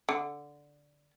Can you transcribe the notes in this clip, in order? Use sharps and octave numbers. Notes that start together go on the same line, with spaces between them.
D3